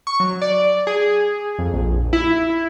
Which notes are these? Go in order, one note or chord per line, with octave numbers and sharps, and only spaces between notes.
C#6
F#3
D5
G#4
F2
A#1
E4
E4